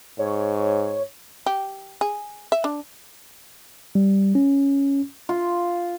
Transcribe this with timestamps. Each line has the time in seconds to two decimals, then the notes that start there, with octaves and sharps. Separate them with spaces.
0.19 G#2 C#5
1.46 G4
2.01 G#4
2.52 E5
2.64 D4
3.95 G3
4.35 C#4
5.29 F4